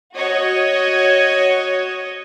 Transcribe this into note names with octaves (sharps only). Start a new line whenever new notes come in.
F#4 C#5 D#5